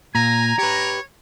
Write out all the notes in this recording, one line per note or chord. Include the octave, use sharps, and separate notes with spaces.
A#2 G#5 A#5
G4 B4 C#5